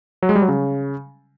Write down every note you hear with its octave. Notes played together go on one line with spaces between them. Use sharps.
F#3
G#3
G3
F#3
C#3